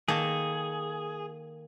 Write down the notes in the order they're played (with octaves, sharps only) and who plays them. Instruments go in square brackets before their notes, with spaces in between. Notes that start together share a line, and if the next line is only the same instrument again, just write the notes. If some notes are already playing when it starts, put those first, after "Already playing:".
[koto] D#3 A#3 A4 [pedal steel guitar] G#4